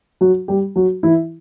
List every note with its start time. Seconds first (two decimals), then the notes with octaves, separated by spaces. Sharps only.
0.21 F#3 F#4
0.48 G3 G4
0.76 F#3 F#4
1.03 E3 E4